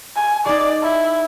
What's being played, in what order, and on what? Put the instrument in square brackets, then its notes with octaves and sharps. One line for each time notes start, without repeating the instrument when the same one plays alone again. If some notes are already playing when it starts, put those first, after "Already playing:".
[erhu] G#5
[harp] D#4 G#4 [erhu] D5
[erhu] E4